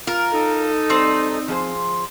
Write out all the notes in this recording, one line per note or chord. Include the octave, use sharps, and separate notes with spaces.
F4 A#4
D#4 A4
G3 C4
F3 G#4 C5